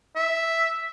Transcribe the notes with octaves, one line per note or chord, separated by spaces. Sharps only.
E5